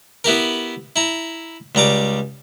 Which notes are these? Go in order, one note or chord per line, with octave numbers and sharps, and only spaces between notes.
B3 E4 G4 A#4
E4 A#5
C#2 G3 A#5 D6